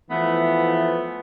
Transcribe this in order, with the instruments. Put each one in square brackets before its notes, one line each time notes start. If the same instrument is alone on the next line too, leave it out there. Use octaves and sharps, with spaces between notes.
[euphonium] E3 [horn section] F3 A3 B3